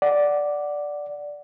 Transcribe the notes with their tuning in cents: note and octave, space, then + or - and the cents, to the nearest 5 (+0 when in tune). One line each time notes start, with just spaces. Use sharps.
D5 +0 F#5 +0